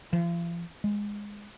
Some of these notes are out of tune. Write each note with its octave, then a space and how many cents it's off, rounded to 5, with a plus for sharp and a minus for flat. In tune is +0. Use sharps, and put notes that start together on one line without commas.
F3 -40
G#3 -10